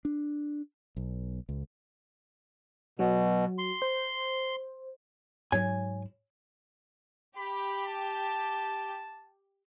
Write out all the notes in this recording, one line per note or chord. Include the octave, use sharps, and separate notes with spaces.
D4
B1
C#2
B2 F#3 F#4
C6
C5
G#2 F#3 C#5 G#5
G4 B5
A5